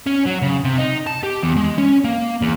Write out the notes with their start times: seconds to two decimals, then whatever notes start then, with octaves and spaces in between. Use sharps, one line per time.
0.07 C#4
0.26 F#3
0.42 C#3
0.64 C3
0.78 D#4
1.07 A5
1.23 G4
1.43 E2
1.57 G#3
1.78 C#4
2.04 A#3
2.42 E2